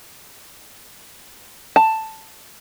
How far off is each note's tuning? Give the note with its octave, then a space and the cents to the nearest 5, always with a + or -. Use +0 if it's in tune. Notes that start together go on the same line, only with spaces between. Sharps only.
A5 +5